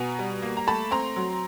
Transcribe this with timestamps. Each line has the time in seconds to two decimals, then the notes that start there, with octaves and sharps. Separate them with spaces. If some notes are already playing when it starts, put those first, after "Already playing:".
Already playing: B2 B3 G#5 A#5
0.19 G3
0.42 A#3
0.57 A#5
0.67 A3 A5 B5
0.91 C4 A#5 C6
1.16 F#3